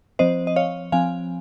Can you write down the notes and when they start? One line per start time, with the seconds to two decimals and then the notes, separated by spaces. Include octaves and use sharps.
0.19 F3 C4 C5 D#5
0.47 D#5
0.56 C#5 F5
0.92 F3 C4 F5 G#5